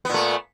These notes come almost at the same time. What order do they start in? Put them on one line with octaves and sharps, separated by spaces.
B3 A#2 A3